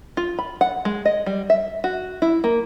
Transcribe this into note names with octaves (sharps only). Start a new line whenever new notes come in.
F4
B5
F#5
G#3
D#5
G3
E5
F#4
E4
A#3